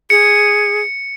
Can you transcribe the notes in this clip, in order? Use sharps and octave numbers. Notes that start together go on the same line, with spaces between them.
G#4 C#7